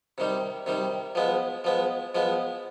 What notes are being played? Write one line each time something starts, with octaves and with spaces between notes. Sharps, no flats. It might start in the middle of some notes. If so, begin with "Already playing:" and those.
C3 D#3 G3
C3 D#3 G3
F3 G#3 B3
F3 G#3 B3
F3 G#3 B3